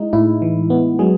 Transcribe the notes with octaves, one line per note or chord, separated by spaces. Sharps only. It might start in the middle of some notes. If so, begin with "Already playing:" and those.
Already playing: G#3 D#4 E4
A2 E4
E3
B3
F#3 G#3 G#4